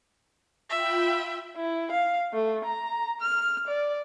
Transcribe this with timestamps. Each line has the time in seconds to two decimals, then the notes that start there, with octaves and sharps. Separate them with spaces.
0.70 F4 E5 G5 B5
1.56 E4
1.92 F5
2.33 A3
2.65 A#5
3.21 F6
3.68 D5